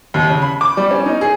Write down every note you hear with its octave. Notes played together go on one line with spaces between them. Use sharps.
D#2
C#3
B5
D6
G3
C#4
D#4
G#4